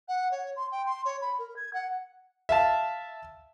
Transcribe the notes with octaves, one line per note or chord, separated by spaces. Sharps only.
F#5
C#5
C6
G5
C6
C#5
B5
A#4
G#6
F#5
E5 F5 A5